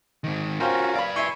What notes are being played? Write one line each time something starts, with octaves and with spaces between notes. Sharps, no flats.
G#2 D#3
C#4 F4 F#4 A#4 C5 F5 G5
B4 D5 F5 B5
E4 E5 G#5 C6 C#6